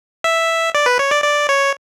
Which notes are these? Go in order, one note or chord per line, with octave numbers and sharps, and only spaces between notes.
E5
D5
B4
C#5
D5
D5
C#5